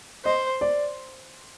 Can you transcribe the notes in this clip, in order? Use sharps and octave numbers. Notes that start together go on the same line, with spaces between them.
C5 D#5
D5